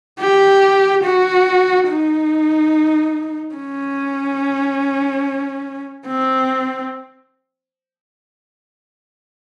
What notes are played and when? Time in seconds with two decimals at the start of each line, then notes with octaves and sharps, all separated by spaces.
0.20 G4
1.04 F#4
1.88 D#4
3.55 C#4
6.07 C4